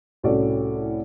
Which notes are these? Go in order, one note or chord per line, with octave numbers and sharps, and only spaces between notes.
C2 A2 C#4 F#4 A4 D5